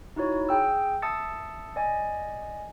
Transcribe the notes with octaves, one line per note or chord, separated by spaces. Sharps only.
D#4 E4 F#4 C#5
G#4 G5 E6
E5 A5 D#6 E6 A6 C#7
D5 D#5 G#5